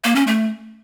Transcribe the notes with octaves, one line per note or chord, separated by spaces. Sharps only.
A#3
C#4
A3